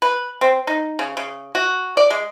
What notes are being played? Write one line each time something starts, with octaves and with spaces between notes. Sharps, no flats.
B4
C4
D#4
C#3
C#3
F#4
D5
G#3